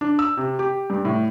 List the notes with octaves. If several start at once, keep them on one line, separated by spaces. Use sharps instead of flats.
D4
E6
C3
G4
G2
A2